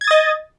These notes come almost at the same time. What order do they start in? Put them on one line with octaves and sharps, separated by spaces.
G#6 A6 D#6 D#5